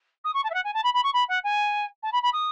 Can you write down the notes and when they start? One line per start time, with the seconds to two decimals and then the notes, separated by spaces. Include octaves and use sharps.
0.24 D#6
0.34 C#6
0.44 A5
0.50 E5
0.54 F#5
0.64 G#5
0.74 A5
0.84 B5
0.94 B5
1.03 C#6
1.14 B5
1.29 F#5
1.44 G#5
2.03 A5
2.12 B5
2.23 B5
2.33 D#6